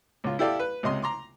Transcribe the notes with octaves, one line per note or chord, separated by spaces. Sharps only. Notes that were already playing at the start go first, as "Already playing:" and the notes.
C#2 F4
E4 G4 A4 D5 F5
B4
C#2 C3 D#5 C6
A#5 C6 D6